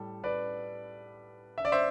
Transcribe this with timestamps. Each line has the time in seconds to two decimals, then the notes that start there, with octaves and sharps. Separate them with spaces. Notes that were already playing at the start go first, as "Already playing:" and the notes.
Already playing: A2 G3 A4
0.24 B4 D5
1.58 E5
1.65 D5
1.72 C5 E5